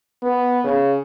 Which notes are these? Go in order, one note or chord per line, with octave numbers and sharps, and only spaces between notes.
B3
C#3